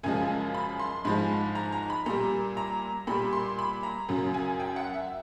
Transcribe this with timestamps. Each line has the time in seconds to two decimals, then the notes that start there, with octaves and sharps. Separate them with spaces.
0.03 F#2 C#3 F3 G#3 G#5
0.54 B5
0.79 C6
1.05 G#2 F3 G#3 B5
1.55 A#5
1.72 A#5
1.90 B5
2.06 A#2 G3 A#5
2.57 A#5
3.07 A#2 G3 B5
3.33 C6
3.59 B5
3.83 A#5
4.09 F#2 C#3 F#3
4.34 G#5
4.60 G5
4.76 F#5
4.94 E5